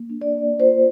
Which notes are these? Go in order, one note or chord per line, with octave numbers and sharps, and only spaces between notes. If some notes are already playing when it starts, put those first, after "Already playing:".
Already playing: A#3
D4
D5
A#3
F4 C5